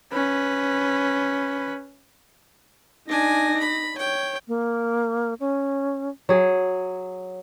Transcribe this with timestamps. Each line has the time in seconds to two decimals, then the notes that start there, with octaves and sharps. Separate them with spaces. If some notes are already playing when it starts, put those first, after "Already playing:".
0.13 C#4 B4
3.08 D4 D#4 G#5 A#6
3.59 B5
3.97 C#5 G5
4.48 A#3
5.40 C#4
6.29 F#3 G#4